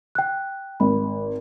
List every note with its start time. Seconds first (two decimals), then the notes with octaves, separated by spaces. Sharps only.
0.15 G5 F#6
0.80 G#1 B5